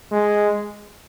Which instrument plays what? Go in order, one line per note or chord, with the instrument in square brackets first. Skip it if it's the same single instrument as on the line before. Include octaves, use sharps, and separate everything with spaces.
[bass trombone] G#3